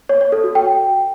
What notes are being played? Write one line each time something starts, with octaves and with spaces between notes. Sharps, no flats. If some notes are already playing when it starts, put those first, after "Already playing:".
C#5
C#5
A4
F#4
G5